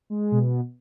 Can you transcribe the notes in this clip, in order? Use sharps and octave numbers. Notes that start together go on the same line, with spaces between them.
G#3
B2